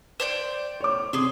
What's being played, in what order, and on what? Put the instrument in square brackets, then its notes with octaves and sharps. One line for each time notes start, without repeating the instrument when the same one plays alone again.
[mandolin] C5 D5 G5
[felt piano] C#5 D6
[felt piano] C3 [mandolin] G#4 C6